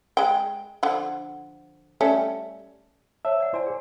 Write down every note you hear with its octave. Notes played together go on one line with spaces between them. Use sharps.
G#3 G5
D3 F3 F#5
G3 A3 C#4
C5 C#5 E5 A5
D5 F#5
E4 C5 D5 G#5
G#4